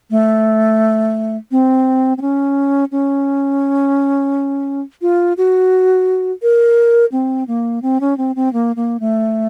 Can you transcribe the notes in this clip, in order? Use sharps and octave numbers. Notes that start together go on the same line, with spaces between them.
A3
C4
C4
C#4
C#4
F4
F#4
A#4
C4
A#3
C4
C#4
C4
C4
A#3
A#3
A3